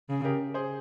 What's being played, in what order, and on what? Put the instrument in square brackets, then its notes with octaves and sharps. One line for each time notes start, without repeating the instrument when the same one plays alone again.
[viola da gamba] C#3
[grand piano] G4 A#4
G#4 C5